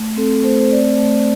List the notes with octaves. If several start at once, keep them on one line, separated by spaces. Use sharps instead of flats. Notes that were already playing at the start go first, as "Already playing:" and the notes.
Already playing: A3
C4 A4
A3 C5
C5
C4 D5
A3